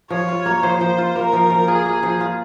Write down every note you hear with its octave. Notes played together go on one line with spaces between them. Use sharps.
F3 C#5
F4
A#3
F3 C5
F3
F4
A#3 A#4
F3
F3
F4 G#4
A#3
F3
F4